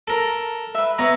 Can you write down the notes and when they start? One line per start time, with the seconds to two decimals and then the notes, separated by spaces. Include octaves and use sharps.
0.08 A4 A#4
0.75 B4 E5
0.98 B3 C#5 E5 A#5